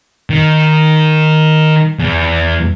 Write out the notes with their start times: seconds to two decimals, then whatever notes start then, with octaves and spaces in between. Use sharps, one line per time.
0.30 D#3
1.99 E2